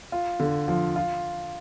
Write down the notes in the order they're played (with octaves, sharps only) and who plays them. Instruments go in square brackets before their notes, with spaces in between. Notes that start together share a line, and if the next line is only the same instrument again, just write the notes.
[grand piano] F4
D3
F3
F4